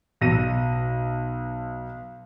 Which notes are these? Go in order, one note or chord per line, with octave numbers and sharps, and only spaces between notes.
B1 A#6 D#7